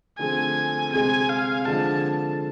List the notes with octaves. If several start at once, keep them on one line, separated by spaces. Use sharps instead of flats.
D3 F3 A3 C4 G#4 G#5
C3 G#3 C4 G#4 G#5
F5
D3 F3 G#3 A5